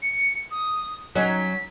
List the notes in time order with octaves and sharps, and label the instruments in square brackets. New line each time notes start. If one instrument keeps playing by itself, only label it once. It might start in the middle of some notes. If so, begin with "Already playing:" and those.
[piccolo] C#7
D#6
[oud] F#3 C#4 D#4 [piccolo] B6